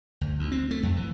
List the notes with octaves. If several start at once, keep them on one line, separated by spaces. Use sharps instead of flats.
D2
D2
C4
A3
F2
E3